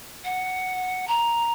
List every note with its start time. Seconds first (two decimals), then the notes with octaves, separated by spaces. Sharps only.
0.24 F#5
1.08 A#5